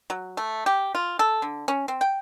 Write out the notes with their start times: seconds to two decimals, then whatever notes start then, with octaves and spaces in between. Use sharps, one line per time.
0.10 F#3
0.37 A3
0.66 G4
0.95 F4
1.19 A4
1.42 D3
1.68 C#4
1.88 C4
2.01 G5